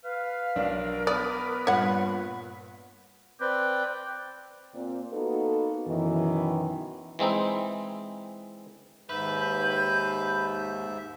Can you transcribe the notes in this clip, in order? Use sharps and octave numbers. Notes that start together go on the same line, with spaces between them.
B4 F5
B1 D4 A#4
B3 B4 D5 D#6
G2 A#2 C#5 F#5
C4 B4 D5 G5
A#2 C4
A#3 B3 D#4 F#4 A4 B4
F#2 B2 D#3 E3
E3 G#3 C4 D#4 E4
D#2 G#2 B4 E5 G6